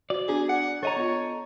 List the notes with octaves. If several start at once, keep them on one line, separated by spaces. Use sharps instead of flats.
F#4 C5 D5
B3 D4 F#4 G#4
F#5
A4 C#5 D#5 A#5
B3 F4